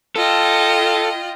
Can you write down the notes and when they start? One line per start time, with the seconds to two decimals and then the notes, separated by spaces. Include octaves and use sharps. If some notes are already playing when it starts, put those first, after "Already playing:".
0.16 F4 A4 D#5 G5